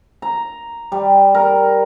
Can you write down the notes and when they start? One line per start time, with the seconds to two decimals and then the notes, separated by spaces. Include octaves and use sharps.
0.22 A#5
0.92 G3
1.35 A#4